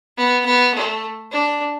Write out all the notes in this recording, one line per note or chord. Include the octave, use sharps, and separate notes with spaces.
B3
B3
A3
D4